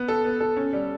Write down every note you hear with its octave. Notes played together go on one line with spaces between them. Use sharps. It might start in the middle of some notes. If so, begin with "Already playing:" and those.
Already playing: B3
A4
B3
A4
C#4
G3